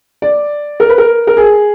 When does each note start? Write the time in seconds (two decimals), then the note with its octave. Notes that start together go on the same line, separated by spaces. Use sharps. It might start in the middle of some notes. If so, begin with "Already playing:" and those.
0.22 D5
0.80 A#4
0.89 B4
0.98 A#4
1.27 A#4
1.37 G#4